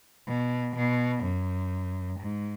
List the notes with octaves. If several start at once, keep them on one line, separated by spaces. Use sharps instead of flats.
B2
B2
F#2
G#2